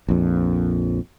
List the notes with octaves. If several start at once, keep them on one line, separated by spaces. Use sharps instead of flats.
A#1 F2